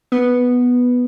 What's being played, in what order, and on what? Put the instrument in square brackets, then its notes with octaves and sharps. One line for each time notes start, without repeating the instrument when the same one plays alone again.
[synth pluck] B3